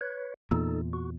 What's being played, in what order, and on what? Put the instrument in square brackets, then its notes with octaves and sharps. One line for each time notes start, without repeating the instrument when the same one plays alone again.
[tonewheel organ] B4 C#5
[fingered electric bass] E2 A#2 [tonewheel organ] D#4 A4
[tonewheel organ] F#4